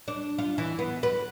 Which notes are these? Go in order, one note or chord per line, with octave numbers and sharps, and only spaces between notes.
D4
F4
E3
B3
B4